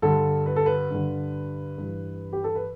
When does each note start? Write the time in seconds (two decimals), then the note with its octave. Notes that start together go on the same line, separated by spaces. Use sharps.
0.02 G2 D3 A4
0.46 B4
0.56 A4
0.66 B4
0.90 G2 D3
1.78 G2 E3
2.33 G4
2.44 A4
2.55 B4